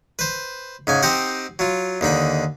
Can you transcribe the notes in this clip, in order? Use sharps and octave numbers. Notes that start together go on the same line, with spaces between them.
B4 C5
G#2 C#3 G#5
C4 D#4 G4 C5 D#5 F#5
F#3 F4
D#2 D3 D#4 B5